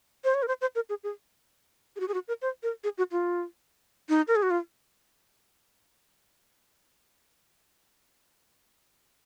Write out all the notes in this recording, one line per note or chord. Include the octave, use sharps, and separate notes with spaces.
C5
C#5
A#4
C5
C5
A#4
G#4
G#4
G#4
F#4
G#4
F#4
A#4
C5
A#4
G#4
F#4
F4
D#4
A#4
G#4
F#4
F4